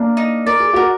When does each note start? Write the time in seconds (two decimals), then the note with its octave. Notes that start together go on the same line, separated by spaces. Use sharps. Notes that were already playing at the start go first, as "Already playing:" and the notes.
Already playing: A#3 D4
0.17 D#4
0.46 A#4 D5
0.60 G#4
0.73 F#4 A#4